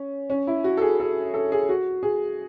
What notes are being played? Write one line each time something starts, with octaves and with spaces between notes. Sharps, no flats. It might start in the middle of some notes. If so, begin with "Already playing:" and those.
Already playing: C#4
C#4
E4
F#4
A4
G#4
A4
A4
G#4
F#4
G#4